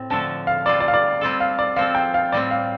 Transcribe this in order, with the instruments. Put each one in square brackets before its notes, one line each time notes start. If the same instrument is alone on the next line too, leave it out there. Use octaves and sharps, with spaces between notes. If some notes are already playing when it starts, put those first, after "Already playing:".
Already playing: [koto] A2 C4
[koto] D3 F3 A3 D4 A4 [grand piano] A5
[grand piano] F5
[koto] G3 F4 A4 [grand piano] D5
[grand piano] D5
F5
D5
[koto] G3 C4 F4 A4
[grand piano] F5
D5
[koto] F3 C4 A4 [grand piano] F5
[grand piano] G5
F5
[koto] A2 G3 C4 [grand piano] D5
[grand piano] F5